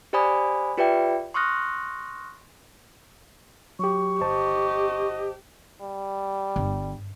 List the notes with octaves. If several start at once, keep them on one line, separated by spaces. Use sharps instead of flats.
G4 C5 D5 G#5 B5 D#6
F4 G4 B4 D5 E5 G5
C6 C#6 D#6 F6 F#6 A#6
F#3 G4 C#6
G1 G4 C5 D#5 A5
G3
G1